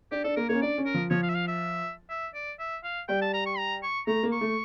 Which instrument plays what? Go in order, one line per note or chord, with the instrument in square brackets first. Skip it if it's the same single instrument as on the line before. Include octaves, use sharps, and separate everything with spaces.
[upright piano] D4 [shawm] G4
[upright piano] D4 [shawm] A4
[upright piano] A#3 [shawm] A#4
[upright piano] A#3 [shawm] C#5
[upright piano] C#4
[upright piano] D4 [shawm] D5
[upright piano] C#4
[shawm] A#4
[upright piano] F3
[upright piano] F3 [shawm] C#5
[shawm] F5
E5
F5
E5
E5
D5
E5
F5
[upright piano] G3 [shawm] G5
[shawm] A5
A#5
C#6
A#5
C#6
[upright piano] A3 [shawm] A#5
[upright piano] A#3
[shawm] C#6
[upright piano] A3